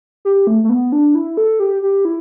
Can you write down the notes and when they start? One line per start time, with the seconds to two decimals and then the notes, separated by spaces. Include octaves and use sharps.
0.25 G4
0.47 A3
0.64 A3
0.69 B3
0.92 D4
1.15 E4
1.37 A4
1.60 G4
1.82 G4
2.05 E4